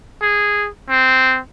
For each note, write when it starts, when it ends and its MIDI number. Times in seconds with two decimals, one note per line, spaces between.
0.22 0.68 68
0.89 1.39 60